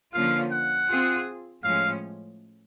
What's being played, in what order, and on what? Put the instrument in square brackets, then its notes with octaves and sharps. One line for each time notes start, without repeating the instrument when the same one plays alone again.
[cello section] D3 F3 A#3 C#4 F4 [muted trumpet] F5
[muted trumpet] F#5
[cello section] C4 F4 G#4
[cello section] A2 F3 G#3 C#4 [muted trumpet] F5